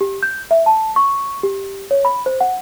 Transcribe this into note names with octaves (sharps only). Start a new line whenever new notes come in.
G4
G6
E5
A5
C#6
G4
C#5
B5
C5
F#5